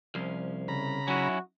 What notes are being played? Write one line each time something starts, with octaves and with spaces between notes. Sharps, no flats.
C2 F3 C#4 C5
C#3 A#5 B5
F#3 C#4 D#4 E4 F#4 E5